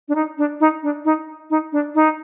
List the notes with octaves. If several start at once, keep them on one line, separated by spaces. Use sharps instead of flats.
D4
D#4
D4
D#4
D4
D#4
D#4
D4
D#4